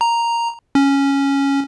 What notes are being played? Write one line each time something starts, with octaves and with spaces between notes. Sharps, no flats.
A#5
C#4